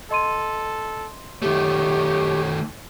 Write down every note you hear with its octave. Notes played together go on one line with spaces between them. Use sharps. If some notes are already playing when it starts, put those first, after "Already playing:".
A4 D#5 C6 D#7
D#3 A3 G4 C#5